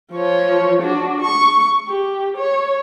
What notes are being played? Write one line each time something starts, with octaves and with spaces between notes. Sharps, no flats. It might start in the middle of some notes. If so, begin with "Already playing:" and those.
F3 C#5
D4 F#4
C#6
G4
C#5